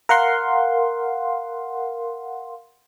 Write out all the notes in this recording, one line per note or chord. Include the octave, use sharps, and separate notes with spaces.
A#4 F5 F#5 C6